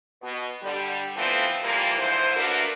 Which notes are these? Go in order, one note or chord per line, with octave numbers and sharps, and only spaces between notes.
B2
D3 G3
D3 E3 F3 A3 B3 C4
C3 E3 F3 G3 A#3
G#2 D3 E3 C5
A3 A#3 D4 F#4 A#4 B4